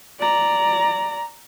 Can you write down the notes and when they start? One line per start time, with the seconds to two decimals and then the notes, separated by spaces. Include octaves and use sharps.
0.19 D5 A#5